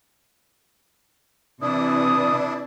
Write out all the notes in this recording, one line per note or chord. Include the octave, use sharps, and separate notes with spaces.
C3 E3 D4 E4 D5 D#6